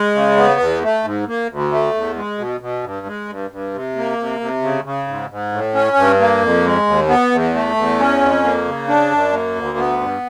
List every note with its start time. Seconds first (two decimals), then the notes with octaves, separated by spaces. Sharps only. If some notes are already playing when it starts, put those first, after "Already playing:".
Already playing: G#3
0.15 C#3
0.37 B3
0.60 E2
0.83 A3
1.04 G#2
1.27 A#3
1.50 D2
1.72 A3
1.94 E2
2.16 G#3
2.38 B2
2.61 B2
2.83 G2
3.06 G#3
3.29 G2
3.51 G2
3.74 C3
3.96 A#3
4.18 C3
4.40 C3
4.62 C#3
4.84 C#3
5.07 G#2
5.30 G#2
5.52 A2
5.74 C#4
5.96 G2
6.19 A#3
6.42 F2
6.65 G#3
6.86 D#2
7.08 B3
7.31 E2
7.54 A3
7.76 E2
7.99 C#4
8.21 F2
8.44 A#3
8.65 C#3
8.88 D4
9.11 F#2
9.32 A#3
9.55 D2
9.77 B3
10.01 G2